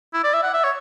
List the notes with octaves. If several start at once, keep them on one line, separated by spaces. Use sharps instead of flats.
E4
D5
E5
F#5
E5
C#5